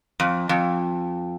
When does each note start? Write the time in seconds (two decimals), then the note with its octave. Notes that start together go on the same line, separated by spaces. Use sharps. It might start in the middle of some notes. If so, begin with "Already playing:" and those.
0.20 F2
0.49 F2